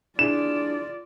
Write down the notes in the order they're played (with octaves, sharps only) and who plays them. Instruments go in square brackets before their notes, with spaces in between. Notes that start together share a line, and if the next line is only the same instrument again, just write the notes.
[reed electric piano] D4 E4 G#4 [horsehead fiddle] F4 D5 [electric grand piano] E7